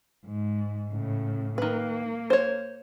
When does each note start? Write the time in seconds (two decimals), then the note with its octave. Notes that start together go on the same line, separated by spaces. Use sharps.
0.25 G#2
0.91 A2 C#3
1.58 D#3 A#3 B4
2.30 C5 C#5